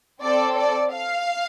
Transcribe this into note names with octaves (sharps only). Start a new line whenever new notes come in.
C4 A4 D5
D5
F5